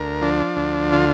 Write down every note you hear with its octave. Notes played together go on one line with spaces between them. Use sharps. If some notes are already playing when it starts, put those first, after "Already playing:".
Already playing: D2 A#4
F3 D4
D2
D3 F4